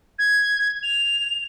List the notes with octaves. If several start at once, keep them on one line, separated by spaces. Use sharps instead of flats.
G#6
F7